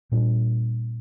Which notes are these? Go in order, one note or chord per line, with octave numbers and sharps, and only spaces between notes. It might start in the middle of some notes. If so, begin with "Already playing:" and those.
A#2 G3 D4